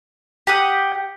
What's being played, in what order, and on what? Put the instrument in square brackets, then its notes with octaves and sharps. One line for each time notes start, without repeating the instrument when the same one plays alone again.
[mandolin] G4 F#5 D#6 [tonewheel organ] G5